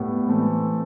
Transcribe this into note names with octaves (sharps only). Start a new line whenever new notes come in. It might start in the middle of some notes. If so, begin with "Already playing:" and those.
Already playing: A2 G3 B3
E3 A3 C4